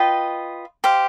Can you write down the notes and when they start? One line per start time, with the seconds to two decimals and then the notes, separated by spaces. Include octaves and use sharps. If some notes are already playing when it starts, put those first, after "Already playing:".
Already playing: F4 B4 D#5 G5
0.84 G4 C5 F5